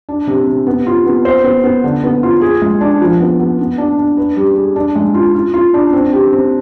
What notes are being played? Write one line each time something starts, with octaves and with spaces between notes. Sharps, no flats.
D4
C3
C3
B3
F4
B3
C5
B3
B3
D3
B3
F4
G#4
G#3
D4
F3
B3
B3
B3
D4
D4
B4
G3
G#4
D4
G#3
F4
F4
F4
D4
C4
G4
C4